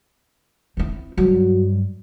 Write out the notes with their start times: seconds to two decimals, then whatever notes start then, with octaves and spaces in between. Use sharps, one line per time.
0.77 C4 E4
1.17 G2 F#3